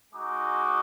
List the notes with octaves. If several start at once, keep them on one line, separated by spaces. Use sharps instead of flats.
G#3 D#4 F#4 D6